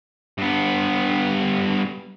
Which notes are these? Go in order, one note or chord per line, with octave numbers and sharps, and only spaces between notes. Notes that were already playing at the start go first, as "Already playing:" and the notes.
G2 B3